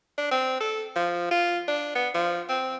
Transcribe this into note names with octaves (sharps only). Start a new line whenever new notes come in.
D4
C4
A4
F3
F4
D4
B3
F3
C4